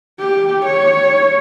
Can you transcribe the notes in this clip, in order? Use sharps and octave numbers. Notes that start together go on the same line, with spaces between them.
G4
C#5